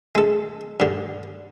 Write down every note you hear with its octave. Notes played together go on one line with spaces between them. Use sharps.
G#3 A4
G2 D3